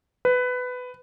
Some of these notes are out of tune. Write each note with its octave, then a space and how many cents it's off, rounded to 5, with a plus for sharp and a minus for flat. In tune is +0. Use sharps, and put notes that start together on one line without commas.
B4 +15